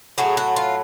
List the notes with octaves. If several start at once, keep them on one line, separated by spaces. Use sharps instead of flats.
A2 F#3 A3 G#4
F#4
F4